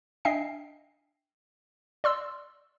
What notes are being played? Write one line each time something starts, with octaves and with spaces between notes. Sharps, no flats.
D4 D#5 E5 G5 G#5 C7
D5 C6 E6